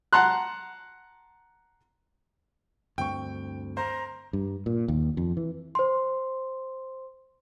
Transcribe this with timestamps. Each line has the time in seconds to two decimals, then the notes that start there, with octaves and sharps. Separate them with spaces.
0.13 F#5 A5 A#5 C6 F#6
2.98 D2 G2 C4 G5 C#6
3.77 C5 A#5
4.33 G2
4.66 A#2
4.88 D#2
5.17 F2
5.37 E3
5.75 C5 C6